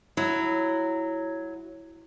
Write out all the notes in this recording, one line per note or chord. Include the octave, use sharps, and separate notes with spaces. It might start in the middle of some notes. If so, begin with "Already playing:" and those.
F#3 E4